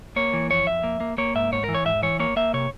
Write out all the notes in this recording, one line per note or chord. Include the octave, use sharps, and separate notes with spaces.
A#3 C#5
E3
F2 C#5
F2 E5
A#3
A#3
A#3 C#5
G#2 E5
G#2 C#5
E3 A#4
C#5
G#2 E5
E3 C#5
A#3 C#5
A#3 E5
C3 C#5